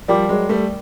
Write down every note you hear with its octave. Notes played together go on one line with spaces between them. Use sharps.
F3 G3 A#4 D5 G5 B5 D6
F#3 G#3
G3 A3